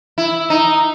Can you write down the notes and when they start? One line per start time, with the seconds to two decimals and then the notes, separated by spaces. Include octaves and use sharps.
0.18 E4
0.50 D#4